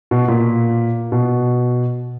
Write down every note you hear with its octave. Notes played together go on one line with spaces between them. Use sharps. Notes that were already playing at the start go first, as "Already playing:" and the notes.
B2
A#2
B2